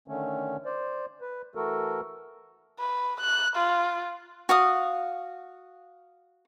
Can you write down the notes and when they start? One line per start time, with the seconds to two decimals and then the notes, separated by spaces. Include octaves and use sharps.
0.08 D3 D#3 A3 C#4
0.65 C5 D5
1.21 B4
1.55 E3 A3 F#4 A4 A#4
2.79 B4
3.20 F#6
3.56 F4
4.49 F#4 F5 D#6